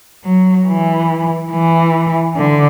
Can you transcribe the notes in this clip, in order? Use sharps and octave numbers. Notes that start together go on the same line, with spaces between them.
F#3
E3
E3
D3